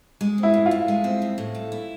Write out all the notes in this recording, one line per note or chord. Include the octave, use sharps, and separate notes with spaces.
G#3
C4
E4
A2
F4
A2
G#3
C4
A2
A2
A3
E4